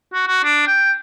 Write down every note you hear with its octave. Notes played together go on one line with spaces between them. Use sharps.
F#4
F#4
D4
G5